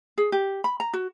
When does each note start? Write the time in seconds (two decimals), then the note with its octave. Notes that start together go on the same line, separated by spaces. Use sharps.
0.18 G#4
0.32 G4
0.64 B5
0.80 A#5
0.93 F#4